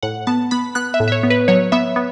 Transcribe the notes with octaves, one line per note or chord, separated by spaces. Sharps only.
A2 F#5
B3 A5
B3 B5
B3 F#6
E5
A2
E5
C#5
B3
B4
F#3 C#5
B3 E5
B3